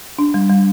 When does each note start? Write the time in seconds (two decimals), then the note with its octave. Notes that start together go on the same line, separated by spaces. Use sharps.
0.19 D4
0.34 G3
0.49 G3